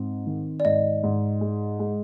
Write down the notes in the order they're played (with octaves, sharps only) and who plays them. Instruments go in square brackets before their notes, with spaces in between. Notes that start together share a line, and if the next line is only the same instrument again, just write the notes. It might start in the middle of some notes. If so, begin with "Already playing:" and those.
Already playing: [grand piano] G#2 C4
D#3
[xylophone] D5
[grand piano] G#2 [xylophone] D#5
[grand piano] G#2
G#3
G#3